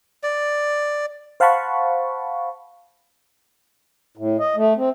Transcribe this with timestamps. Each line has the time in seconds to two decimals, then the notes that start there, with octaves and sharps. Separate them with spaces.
0.23 D5
1.40 C5 F5 F#5 A5 B5 C#6
4.17 A2
4.40 D#5
4.56 A3
4.77 C4